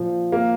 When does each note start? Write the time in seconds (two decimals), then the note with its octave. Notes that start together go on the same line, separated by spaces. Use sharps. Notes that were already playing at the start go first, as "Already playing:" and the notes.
Already playing: A#2 F3
0.32 A#3